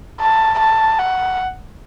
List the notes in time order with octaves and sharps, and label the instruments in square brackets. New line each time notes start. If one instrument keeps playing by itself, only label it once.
[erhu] A5
A5
F#5